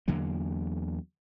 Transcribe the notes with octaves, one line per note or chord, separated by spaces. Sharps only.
E2 D3 F#3 A#3